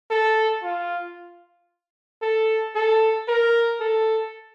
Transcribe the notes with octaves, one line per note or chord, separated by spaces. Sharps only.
A4
F4
A4
A4
A#4
A4